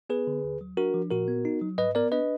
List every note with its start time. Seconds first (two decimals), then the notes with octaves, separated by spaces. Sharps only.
0.10 B3 G#4 B4
0.27 D3
0.44 D#2
0.61 F#3
0.77 D4 F#4 A#4
0.94 F3
1.11 A#2 F#4 A#4
1.28 B3
1.45 D#4
1.61 F#3
1.78 G#2 B4 D#5
1.95 B3 A#4 D5
2.12 D4 B4 D#5